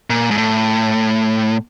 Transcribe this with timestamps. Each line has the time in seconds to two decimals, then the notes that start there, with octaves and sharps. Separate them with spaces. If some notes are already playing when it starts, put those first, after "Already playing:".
0.10 A#2
0.31 G#2
0.37 A2